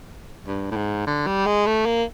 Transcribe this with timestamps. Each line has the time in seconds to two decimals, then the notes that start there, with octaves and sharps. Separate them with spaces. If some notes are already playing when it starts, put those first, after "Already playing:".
0.47 G2
0.71 A2
0.76 G#2
1.07 D3
1.27 G3
1.46 G#3
1.66 A3
1.86 A#3